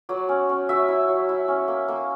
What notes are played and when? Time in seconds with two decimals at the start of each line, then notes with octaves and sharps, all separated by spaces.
0.09 F#3 D5
0.29 C#4
0.49 C#4
0.69 F#3 E5
0.88 E4
1.08 F#3
1.29 E4
1.48 C#4
1.68 A#3
1.88 A#3